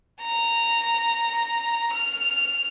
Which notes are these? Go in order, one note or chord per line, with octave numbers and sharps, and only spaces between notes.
A#5
F6